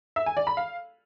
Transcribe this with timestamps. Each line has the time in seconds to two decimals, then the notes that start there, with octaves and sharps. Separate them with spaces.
0.16 E5
0.26 G#5
0.37 D5
0.47 B5
0.57 F5